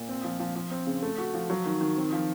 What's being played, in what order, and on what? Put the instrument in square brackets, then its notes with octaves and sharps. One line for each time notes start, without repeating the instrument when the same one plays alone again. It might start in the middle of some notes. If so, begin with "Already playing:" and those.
Already playing: [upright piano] A#2
C4
F3
F3
F3
C4
C#3
A3
F#4
F3
F#3
D#3
D#3
C4
F3